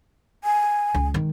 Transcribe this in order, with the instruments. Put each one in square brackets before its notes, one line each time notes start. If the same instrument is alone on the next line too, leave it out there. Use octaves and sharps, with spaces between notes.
[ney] G#5
[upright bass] C#2
D#3 G#3